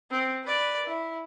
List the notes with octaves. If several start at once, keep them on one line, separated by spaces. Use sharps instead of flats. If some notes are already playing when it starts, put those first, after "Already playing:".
C4
B4 D5
E4